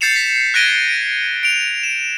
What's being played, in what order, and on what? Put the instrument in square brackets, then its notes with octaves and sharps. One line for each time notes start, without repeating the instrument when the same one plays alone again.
[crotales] G6 A6 C7 C#7 E7 F7
B6
F#6 G#6 A#6 D7 D#7 G7
D7
D7 F7
E7